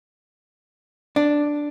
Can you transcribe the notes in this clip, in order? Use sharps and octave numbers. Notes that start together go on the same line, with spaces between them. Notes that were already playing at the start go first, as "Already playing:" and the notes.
D4